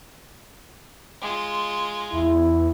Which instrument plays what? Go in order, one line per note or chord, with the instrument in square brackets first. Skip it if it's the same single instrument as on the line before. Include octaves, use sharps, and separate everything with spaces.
[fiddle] G#3 F4
[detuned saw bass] E2 [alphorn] E4